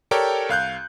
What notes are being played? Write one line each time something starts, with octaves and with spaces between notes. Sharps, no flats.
G4 A4 A#4 C#5 D5 G5
C2 F5 F#6 G6